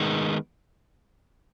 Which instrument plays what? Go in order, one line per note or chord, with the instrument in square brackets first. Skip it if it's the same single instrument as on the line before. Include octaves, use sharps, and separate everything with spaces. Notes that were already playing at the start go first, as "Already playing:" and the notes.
Already playing: [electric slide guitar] D#3 G#3 B3